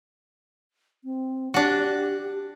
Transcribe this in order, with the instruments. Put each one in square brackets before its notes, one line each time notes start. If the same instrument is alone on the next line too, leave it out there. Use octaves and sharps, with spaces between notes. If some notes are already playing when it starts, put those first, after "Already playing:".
[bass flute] C4
[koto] D4 F#4 [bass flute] G4